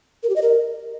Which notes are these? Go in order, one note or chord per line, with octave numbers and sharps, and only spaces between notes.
A#4
G4
D#5
A#4